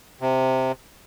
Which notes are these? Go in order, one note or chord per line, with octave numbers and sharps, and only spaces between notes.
C3